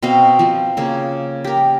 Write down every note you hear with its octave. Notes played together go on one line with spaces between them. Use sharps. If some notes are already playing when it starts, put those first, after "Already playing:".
B2 C4 D#5 F5
F3 C4
C#3 A#3
G4 A#4